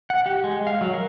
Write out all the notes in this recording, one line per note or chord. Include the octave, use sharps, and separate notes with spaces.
F#5
G4
G#3
F5
F#3
A#4